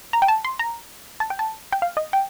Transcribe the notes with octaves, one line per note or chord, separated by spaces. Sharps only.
A#5
G5
A5
C6
A#5
A5
G5
A5
G5
F5
D#5
G5